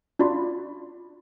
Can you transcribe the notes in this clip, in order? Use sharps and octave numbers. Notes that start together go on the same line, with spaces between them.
D4 F4 F#4 D5 B5 C6